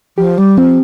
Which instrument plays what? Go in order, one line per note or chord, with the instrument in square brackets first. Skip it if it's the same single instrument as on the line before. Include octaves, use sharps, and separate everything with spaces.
[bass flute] F3 [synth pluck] G4
[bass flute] G3
[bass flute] F3 [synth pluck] C4